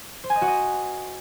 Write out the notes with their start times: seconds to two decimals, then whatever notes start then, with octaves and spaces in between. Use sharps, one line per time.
0.24 C5
0.30 G#5
0.36 D#5
0.42 F#4
0.48 D#5